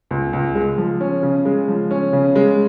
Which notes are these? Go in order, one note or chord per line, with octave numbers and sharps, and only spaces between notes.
C#2
C#2
G#3
F3
C#4
C#3
G#3
F3
C#4
C#3
G#3